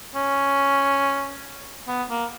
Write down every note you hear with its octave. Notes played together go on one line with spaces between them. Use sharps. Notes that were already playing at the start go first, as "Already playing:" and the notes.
C#4
B3
A#3